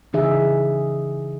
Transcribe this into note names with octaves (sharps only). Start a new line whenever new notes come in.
C#3 E3 D#4 G#4 E5